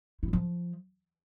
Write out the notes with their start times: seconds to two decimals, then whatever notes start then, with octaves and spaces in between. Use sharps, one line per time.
0.23 E4
0.28 F#3
0.33 F3